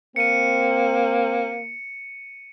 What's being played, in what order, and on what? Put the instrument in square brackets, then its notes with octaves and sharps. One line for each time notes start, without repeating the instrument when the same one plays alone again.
[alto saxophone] A#3 [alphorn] C4 [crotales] C#7 D#7